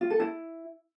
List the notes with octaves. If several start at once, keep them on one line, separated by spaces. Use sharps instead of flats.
F4
A4
E4